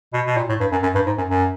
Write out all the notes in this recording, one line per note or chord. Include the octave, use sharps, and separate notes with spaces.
B2
B2
A#2
A2
G2
F#2
F#2
G2
G#2
F#2
F#2